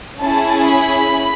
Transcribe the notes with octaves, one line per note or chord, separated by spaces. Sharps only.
C#4 E4 G#4 A5
B5